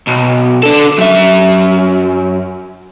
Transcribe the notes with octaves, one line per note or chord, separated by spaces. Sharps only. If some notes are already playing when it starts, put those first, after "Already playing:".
B1
D4 A4
F#2 E5